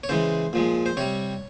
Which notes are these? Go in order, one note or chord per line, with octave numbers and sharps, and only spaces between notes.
C#5
C#3 E3 G#3 C5
A#2 F3 G#3
C5
C3 G3 C#5